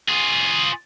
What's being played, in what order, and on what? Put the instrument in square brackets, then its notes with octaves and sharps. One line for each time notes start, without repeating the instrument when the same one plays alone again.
[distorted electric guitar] F4 G#4